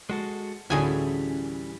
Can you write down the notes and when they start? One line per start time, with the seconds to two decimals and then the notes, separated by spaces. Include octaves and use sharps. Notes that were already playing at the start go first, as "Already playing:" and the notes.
0.10 G#3 F#4 A4
0.70 D2 A2 E3 G3 C#4 G#4 G#5